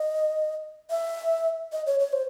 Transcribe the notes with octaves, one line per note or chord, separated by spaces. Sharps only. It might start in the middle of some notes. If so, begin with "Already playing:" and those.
Already playing: D#5
E5
D#5
C#5
C#5
C5